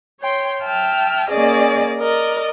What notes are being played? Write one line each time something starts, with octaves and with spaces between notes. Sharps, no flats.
C#5 G5 C6
E5 G5 A5 F6
A#3 C#4 G#4 D5 D#5
A#4 D5 D#5